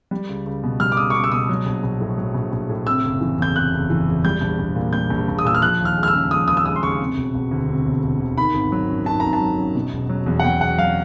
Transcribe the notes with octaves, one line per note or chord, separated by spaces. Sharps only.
G3
C#2
C#2
B2
G3 F6
D6
C#2 D#6
C#6
C#2 D6
E6
B2 D#6
F#3
A#1
A#1
A2
F#3
A#1
A#1
A2
C3 E6
F#1
E3
E2 G6
C3 F#6
F#1
E3
E2
G3 G6
A#1
A#1
A#2
G3 G6
A#1
A#1
D#6
A#2 E6
F6
F3 F#6
D#2
F6
G#3
F6
E6
C#3
F3 D#6
D#2 D#6
E6
G#3 D#6
C6
C#3 C#6
C3
E1
E1
D2
C3
E1
E1
D2
D#3 B5
G#1
F#3
F#2
D#3 A5
G#1 A#5
A5
F#3
F#2
B2
E1
F#3
E2
F#5
B2 G5
E1 F#5
F#3 F5